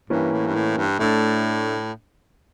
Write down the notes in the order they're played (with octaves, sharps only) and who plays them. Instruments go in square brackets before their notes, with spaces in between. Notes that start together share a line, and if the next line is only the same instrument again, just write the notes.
[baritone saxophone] G2 [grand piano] E3 A#3 C#4
[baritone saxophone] A2
G2
A2
G2
[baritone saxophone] A2 [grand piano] A3 D4 A4